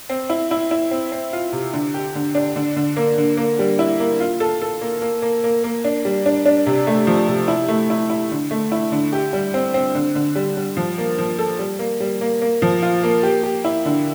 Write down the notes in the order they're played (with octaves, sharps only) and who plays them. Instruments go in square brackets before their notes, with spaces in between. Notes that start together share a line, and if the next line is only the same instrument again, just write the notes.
[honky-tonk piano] C4
E4
E4
E4
C4
C4
F4
C3
D3
G4
D3
D4
D3
D3
A#3
D3
A#3
G3
E4
A#3
F4
A4
A4
A#3
A#3
A#3
A#3
A#3
D4
G3
D4
D4
C3
A3
F3
C3
E4
A3
E4
E4
D3
A3
E4
D3
G4
G3
C4
C4
D3
D3
G3
G3
F3
A#3
F3
A4
G3
A#3
G3
A#3
A#3
F3
F4
A#3
G4
G4
E4
D3